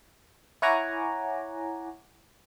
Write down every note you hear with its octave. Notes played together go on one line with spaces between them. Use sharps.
E4 C#5 F#5 G#5 A#5 D6